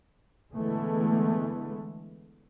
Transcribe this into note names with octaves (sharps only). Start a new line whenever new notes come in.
D3 E3 G#3 A3 B3